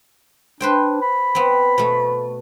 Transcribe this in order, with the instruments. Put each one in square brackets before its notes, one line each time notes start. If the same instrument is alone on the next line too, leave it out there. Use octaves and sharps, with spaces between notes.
[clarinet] D4 [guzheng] B4 C5 G5
[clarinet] B5
[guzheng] B3 C4
B2 A3